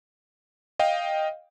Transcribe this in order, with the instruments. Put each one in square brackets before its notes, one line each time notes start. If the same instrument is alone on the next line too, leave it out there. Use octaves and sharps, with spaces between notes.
[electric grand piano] D#5 F5 G5